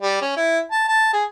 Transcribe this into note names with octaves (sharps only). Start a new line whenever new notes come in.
G3
C#4
E4
A5
A5
G#4